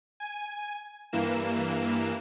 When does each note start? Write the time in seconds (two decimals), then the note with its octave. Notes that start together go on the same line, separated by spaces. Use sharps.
0.20 G#5
1.12 G2 E3 A#3 E7